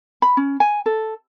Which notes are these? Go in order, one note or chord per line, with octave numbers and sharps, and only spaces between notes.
B5
C#4
G#5
A4